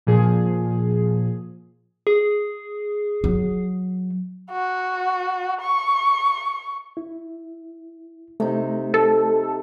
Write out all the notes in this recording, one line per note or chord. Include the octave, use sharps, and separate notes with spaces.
A#2 F3 G#4
G#4
F#3
F#4
C#6
E4
C3 A3 D#4
A4